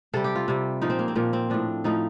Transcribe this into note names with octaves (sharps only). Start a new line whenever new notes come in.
C3 G3 A4
G4
F4
C3 G3
A#2 F3 D#4
C4
A#3
C4
A#2 F3 A#3
C4
A2 F3 D4
A2 F3 D#4